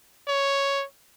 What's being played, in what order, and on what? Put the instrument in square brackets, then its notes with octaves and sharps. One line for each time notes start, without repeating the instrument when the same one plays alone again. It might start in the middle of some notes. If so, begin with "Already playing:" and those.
[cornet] C#5